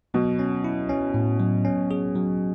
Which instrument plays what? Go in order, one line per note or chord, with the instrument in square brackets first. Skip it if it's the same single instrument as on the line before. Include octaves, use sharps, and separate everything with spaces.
[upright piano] B2 [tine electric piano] F#3
[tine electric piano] C#4
E4
C#4
A2
F#3
C#4
G#4
F#3